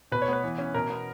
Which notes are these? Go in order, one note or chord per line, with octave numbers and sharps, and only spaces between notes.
B2 B4
C#5
B3 B4
E3
C#4
B2 A#4
B3